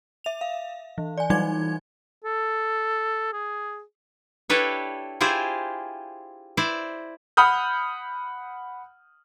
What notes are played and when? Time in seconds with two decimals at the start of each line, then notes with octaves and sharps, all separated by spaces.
0.24 E5 F7
0.41 F5
0.98 E3
1.18 D5 G#5
1.30 E3 F#3 G3 D#4 G#5 G#6
2.24 A4
3.33 G#4
4.50 D4 E4 G4 A4 B4 C#5
5.21 E4 F4 G4 G#4 C5
6.57 E4 C5 D5
7.37 F#5 B5 D#6 F6 G6